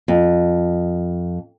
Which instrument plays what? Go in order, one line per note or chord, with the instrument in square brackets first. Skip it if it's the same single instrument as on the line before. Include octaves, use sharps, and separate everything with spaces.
[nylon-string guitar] F2